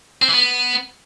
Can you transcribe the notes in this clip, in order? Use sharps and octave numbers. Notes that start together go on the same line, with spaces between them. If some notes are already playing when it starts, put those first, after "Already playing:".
C4
E3
B3